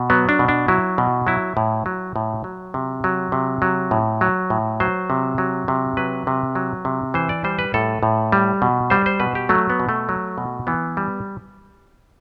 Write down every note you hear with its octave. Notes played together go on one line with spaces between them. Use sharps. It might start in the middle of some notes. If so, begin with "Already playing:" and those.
Already playing: B2
F#3 B3
D4
B2
D4
F#3 E4
B2
F#3 E4
A2
F#3
A2
F#3
C3
F#3
C3
F#3
A2
F#3
A2
F#3 C5
C3
F#3
C3
F#3 B4
C3
F#3
C3
E3 C5
D5
G3 C5
B4
A2 A4
A2
G3
B2
G3 C5
C5
B2 B4
G4
F#3 A3
B3
B2
A3
F#3
B2
E3 B3
G3